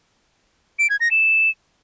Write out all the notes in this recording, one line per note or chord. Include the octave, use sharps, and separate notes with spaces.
D7
G#6
A#6
E7